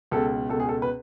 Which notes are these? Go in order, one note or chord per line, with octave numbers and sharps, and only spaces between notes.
C#2 B2 A4
C#2 B2 A4
G#4
A4
B4